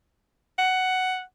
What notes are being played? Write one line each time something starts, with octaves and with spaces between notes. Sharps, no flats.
F#5